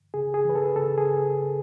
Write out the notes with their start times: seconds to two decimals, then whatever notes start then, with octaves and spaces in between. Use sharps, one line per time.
0.14 C#3 G#4
0.34 G#4
0.45 E3 B4
0.55 A4
0.76 C#3 A4
0.98 G#4